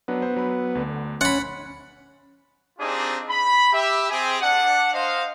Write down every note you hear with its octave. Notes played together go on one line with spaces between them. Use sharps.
F#3 B3 D4
C5
F#3 B5
D2 D3
C#4 F#5 B5 C6 A6
C4 D4 D#4 F4 G4 G#4
B5
G4 E5
C4 G4 G#4
D4 F#5
C5 D#5 F5